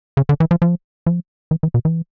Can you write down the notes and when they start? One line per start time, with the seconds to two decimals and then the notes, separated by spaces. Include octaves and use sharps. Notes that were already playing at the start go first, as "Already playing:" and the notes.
0.17 C#3
0.29 D3
0.40 E3
0.51 F3
0.62 F3
1.06 F3
1.51 E3
1.63 E3
1.74 B2
1.85 E3